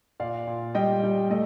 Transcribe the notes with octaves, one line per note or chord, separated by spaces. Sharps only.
A#2 D5 F5
A#2
G3 D#5 G5
G3
A3 D#5